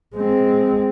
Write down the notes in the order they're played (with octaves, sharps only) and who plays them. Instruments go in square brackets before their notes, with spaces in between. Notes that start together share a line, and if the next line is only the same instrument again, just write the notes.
[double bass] G#3 C4